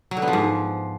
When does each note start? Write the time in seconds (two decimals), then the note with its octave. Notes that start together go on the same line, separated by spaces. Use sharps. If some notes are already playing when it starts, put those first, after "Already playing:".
0.11 F#3
0.17 D3
0.22 B3
0.28 F3
0.33 G#2